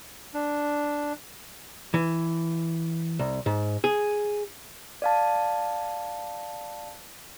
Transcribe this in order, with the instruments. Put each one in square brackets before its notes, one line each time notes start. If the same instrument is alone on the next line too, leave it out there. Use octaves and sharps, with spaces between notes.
[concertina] D4
[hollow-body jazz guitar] E3
C2
G#2
G#4
[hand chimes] D5 F5 A5